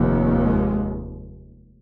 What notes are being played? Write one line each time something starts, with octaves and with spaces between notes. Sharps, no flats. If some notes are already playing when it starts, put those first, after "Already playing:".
Already playing: F1 D#2
G#3